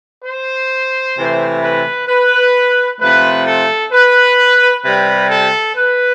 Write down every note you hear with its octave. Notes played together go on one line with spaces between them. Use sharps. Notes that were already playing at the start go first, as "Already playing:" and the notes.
C5
C3 E3 A3
B4
B4
C3 F3 A3 B4
A4
B4
C3 G3 B4
A4
B4